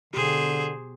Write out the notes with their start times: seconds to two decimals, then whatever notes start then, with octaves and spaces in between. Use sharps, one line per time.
0.14 B2 D3 G4 G#4 C5